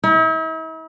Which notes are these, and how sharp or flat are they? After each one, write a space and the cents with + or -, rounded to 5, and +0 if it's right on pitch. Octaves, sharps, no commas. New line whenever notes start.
E4 -45